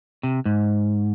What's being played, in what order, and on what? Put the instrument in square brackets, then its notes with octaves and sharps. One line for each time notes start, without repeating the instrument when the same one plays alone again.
[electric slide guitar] C3
G#2